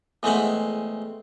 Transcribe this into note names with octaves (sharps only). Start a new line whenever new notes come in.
E2 G#3 A3 C4 E5 F#5